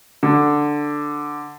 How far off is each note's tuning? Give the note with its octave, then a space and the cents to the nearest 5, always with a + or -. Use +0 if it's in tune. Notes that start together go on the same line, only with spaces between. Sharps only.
D3 +5